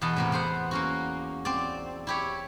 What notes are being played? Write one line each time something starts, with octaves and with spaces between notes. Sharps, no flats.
E2 B2 B3 A5
A2 C3 A#3
B3 C5 F#5
A#3 C#4 F#4
C4 D5
E4 G4 C#5